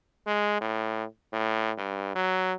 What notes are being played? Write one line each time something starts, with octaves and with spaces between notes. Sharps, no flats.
G#3
A2
A2
G2
F#3